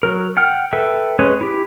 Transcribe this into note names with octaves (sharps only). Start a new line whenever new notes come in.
F#3 A#4
F#5 G5 F6
A4 B4 E5 G5
G#3 C#4 B4 C#5
E4 G4